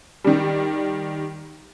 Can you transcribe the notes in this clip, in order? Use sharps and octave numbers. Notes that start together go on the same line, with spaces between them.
D#3 G3